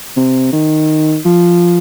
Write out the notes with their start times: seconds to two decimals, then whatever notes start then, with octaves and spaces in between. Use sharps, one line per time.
0.16 C3
0.53 D#3
1.25 F3